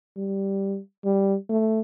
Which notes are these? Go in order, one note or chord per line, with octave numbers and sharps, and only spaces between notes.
G3
G3
A3